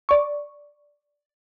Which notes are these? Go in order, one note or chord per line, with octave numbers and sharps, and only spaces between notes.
D5 C#6